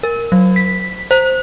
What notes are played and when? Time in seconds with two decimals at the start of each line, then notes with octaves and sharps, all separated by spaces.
0.03 A#4
0.32 F#3
0.56 B6
1.11 C5